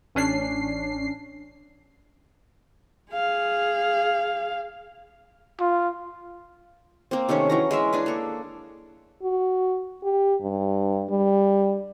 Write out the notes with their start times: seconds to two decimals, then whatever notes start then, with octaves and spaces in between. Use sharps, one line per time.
0.15 A1 C#4 D4 C7
3.12 G#4 F5
5.60 F4
7.11 A#3 C4
7.29 C3 D#3 A3 C#4
7.50 E3 F#3 A#5
7.71 G#3 A#4 E5
7.93 D4 G#4 B4
8.06 A#3 A4
9.23 F#4
10.03 G4
10.41 G2
11.10 G3